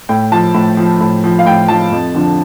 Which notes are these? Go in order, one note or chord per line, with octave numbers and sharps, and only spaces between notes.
A2 G5
F3 A5
A2
F3
A2
F3
F5
A2 G5
F3 A5
F2
D3 F3